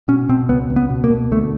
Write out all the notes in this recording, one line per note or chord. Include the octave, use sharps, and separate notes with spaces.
B2 C#4
B2 C4
C#2 B3
C#2
B3
B2
A#3
B2
D2 A3